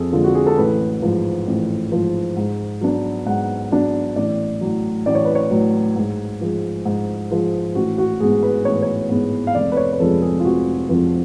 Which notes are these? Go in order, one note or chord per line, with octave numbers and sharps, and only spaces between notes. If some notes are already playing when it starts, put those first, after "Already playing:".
Already playing: F2 G#4 A4
D3 G#3 F4
F#4
G#4
A4
A1 B4
G#2 F3
A1
G#2 F3
G#2
F#3 B3 D4
G#2 F#5
F#3 B3 D4
A1 D5
A2 F#3
A1 D5
C#5
B4
C#5
A2 F#3
G#2
F3 G#3
G#2
F3 G#3
A1 F#4
F#4
G#2 G#3 B3 G#4
B4
A1 C#5
B4
C#5
G#2 G#3 B3
F5
F1 D5
B4
C#5
B4
F2 F3 G#3 A4
G#4
F4
F1 F#4
F2 F3 G#3